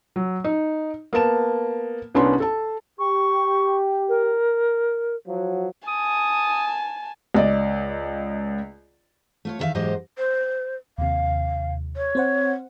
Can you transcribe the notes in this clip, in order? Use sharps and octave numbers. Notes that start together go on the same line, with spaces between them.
F#3
D#4
A#3 B3 A5 E7
C2 B3 C#4 D4 C6
A4 A5
G4 C#6
A#4
F3 F#3
G#5 A5 D#6
C#2 D5 D#5
A3 F4 C#5
E2 D#3 F#4 A#4 E5 F5
E2 G#2 F#3 G4 C5 D#5
C5
D#2 C3 F5
C#5
C4 C5 F#5